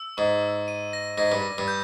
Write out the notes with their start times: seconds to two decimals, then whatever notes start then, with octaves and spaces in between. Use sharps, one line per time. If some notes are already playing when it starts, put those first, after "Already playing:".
Already playing: E6
0.17 G#2 C#6
0.43 E6
0.68 D#7
0.93 A#6
1.18 G#2 A#6
1.32 G2
1.42 A#6
1.58 G2
1.68 G6